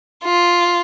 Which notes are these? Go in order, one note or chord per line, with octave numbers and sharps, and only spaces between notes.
F4